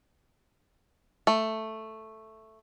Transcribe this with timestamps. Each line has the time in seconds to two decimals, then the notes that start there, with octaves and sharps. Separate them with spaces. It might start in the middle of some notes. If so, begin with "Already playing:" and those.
1.27 A3